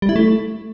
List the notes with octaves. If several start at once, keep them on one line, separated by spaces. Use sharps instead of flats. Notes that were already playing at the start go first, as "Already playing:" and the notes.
G3
E4
A3